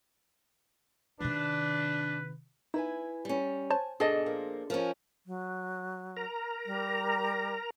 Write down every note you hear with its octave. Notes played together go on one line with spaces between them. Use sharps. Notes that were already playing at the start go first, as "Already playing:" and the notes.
C3 D#3 D4 B4
D#4 E4 B4 G#5
G3 C#4
C5 C#5 G#5 A5
G#2 B2 D4 G#4 A4 D#5
A#2 F3 A#3
F3 C#4 A#4 F5 G#5
F#3
A#4 A#5
G3